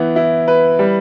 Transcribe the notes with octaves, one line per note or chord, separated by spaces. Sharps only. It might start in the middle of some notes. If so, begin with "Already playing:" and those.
Already playing: E3 B3
E4
B4
G3